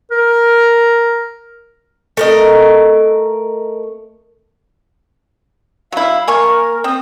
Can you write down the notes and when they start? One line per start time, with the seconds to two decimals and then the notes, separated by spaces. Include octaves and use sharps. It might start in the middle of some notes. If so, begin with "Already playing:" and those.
0.11 A#4
2.17 A3 A#4 D#5
5.92 F#3 E4 F5
6.28 A#3 A#4 G#5 C#6
6.84 C4 D#6